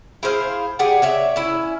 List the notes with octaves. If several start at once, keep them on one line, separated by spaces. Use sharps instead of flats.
E4 G#4 C5 F5
G4 G#4 D5 F#5
C#5 D5 E5
C#4 E4